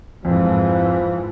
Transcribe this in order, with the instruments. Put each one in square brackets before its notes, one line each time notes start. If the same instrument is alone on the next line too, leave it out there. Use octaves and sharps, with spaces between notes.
[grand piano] F2 [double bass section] G#2 E3 [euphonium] F3